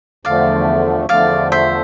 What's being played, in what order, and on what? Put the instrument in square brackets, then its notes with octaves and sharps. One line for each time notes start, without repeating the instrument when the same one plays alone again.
[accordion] E2 D3 F3 A3 [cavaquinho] D5 F5
[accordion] E2 D3 F3 A3 [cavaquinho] D5 F5
[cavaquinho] C5 E5